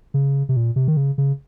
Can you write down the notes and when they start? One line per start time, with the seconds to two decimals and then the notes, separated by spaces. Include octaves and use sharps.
0.14 C#3
0.49 C3
0.56 A#2
0.76 C3
0.88 D#3
0.97 C#3
1.18 C#3